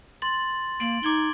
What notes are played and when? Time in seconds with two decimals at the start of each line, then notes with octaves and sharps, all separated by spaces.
0.22 C6 A6 F#7
0.80 A#3 D7 F#7
1.03 D#4 D6 G#6 G7